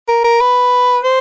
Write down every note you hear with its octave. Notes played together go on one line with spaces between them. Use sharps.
A#4
A#4
B4
C5